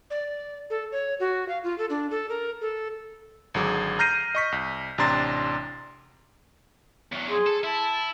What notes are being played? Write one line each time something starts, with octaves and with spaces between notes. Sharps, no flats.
D5
A4
C#5
F#4
F5
F4
A4
D4
A4
A#4
A4
G#1 D3 F#3 G#4 D6
A#5 F6 G6 A#6 C7 D#7
D#5 C#6 B6
C2
A1 C3 D4 A#5 C6 A6
E2 F#3
G#4 C6
A4
E4 A5